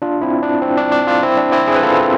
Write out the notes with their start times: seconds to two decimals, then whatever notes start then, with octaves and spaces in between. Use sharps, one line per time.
0.02 D4 F4
0.22 C4 E4
0.43 D4
0.62 C4
0.77 D4
0.92 D4
1.07 D4 F4
1.23 C4 E4
1.37 D4
1.52 C4 E4
1.67 E4 G#4
1.75 B4
1.83 F4 A4